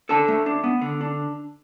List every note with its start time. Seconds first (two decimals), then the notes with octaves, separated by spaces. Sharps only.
0.09 D4 A4 A5
0.28 A3
0.46 D4
0.64 B3
0.81 D3
1.01 D4